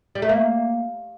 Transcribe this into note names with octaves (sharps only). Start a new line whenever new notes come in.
G3
A3
A#3